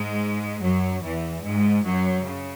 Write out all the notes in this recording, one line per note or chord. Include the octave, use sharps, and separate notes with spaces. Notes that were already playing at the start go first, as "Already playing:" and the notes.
Already playing: G#2 G#3
F#2 F#3
E2 E3
G#2 G#3
F#2 F#3
C#3